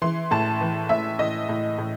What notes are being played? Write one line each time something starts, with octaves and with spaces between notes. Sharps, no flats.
E3 C6
A2 A5
E3
A2 E5
A2 D#5
A2
A2